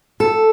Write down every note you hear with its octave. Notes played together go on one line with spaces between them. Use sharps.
A4